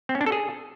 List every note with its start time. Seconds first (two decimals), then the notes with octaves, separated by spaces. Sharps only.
0.09 C4
0.15 C#4
0.21 D4
0.26 A4
0.32 G#4